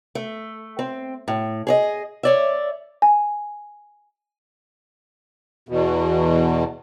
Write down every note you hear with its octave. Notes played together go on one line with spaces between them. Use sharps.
A3
C4
A2
G#4 C#5 D#5
C#5 D5 E5
G#5
E2 B2